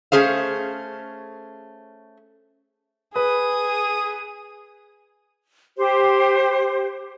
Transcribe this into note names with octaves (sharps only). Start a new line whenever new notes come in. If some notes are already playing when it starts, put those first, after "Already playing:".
A3 C#4 G#4 C5 F5
G#4 B4 D#6
G4 C5